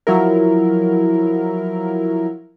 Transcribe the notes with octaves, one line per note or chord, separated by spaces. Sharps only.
F3 F#3 E4 A#4